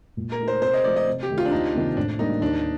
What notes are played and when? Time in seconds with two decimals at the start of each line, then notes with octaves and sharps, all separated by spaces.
0.17 A#2
0.32 A#4
0.40 A3 D#4
0.48 C5
0.62 C3 C5
0.73 D#5
0.84 F3 A3 D5
0.96 D#5
1.07 C3
1.23 G4
1.30 D#3 A3
1.38 F4
1.45 D4
1.52 D2 D#4
1.74 C3 D#3 A#3 D#4
1.97 A2 D4
2.19 G3 A#3 D4 D#4
2.41 D#2 D4